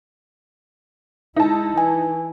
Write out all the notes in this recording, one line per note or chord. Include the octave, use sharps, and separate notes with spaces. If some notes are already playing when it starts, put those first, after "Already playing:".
G#3 D#4 E4 A5
E3 G#5